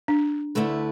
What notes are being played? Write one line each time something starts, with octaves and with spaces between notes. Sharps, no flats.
D4
D2 D3 A3 E4 B4